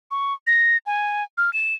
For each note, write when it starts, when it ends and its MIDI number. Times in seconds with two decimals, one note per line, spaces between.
0.11 0.34 85
0.47 0.77 94
0.86 1.24 80
1.38 1.53 89
1.53 1.74 100